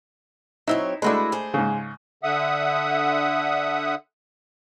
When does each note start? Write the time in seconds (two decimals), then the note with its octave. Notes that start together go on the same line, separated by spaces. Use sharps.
0.67 F#3 C4 D#4 E4 C#5
1.02 G#3 A3 D4 E4 F#4 B4
1.32 G#4 C5
1.54 G#2 C#3
2.23 D3 E5 F#5 D#6